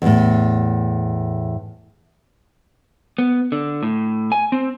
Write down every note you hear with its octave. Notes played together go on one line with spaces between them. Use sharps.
E2 A2
B3
D3
A2
G#5
C4